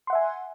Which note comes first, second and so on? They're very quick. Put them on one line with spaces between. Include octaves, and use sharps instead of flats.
C6 F#5 E5 G#5